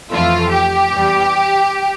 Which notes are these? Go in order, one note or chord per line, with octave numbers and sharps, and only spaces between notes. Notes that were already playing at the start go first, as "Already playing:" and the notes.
F2 E3 A3 F4
G4
E2 E3 G3